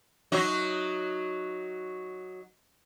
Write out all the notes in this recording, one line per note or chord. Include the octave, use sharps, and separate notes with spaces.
F#3 D#4 F#4